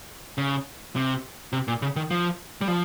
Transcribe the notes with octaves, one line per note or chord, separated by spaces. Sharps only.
C#3
C3
C3
A#2
C#3
D#3
F3
G3
F3